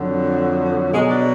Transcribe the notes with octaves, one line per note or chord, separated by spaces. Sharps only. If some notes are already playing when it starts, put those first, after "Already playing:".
Already playing: F2 D3 F#3
B2 F#3 G#3
D4